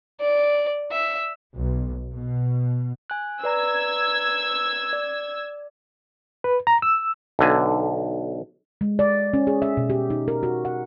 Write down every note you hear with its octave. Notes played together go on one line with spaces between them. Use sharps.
D5
E5
B1
B2
G#5 F#6
B4 D5 A#5 E6 G#6
D5
B4
A#5
E6
B1 D3 G#5
G#3
D5
C#4
G#4
E5
B2
G4
D#4
A#4
F#4
F#5